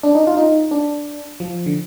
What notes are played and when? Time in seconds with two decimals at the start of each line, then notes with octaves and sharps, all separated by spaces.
0.03 D4
0.15 D#4
0.27 F4
0.37 D#4
0.71 D4
1.40 F3
1.66 D3